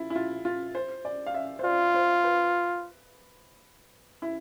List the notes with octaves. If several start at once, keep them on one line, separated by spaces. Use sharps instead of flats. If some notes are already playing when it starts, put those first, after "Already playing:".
Already playing: E4 F4
E4
F4
F4
C5
D5
F5
E5
C5
F4 D5
C5
B4
E4